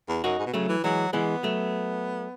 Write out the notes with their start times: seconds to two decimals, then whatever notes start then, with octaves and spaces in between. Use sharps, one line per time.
0.09 E2
0.24 F#2 D#4 F#4
0.39 G#2
0.46 B2
0.53 C#3 F#3 A3
0.68 E3
0.84 E3 F#3 G#3
1.13 E3 G#3 B3
1.43 F#3 A3